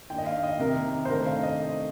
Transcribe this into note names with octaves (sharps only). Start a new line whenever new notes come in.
D#3 A#3 D4 G5
D#5
F5
D#5
C3 D#3 A#3 A#4
C5
C3 D#3 A3 D4 A#4
F5
D#5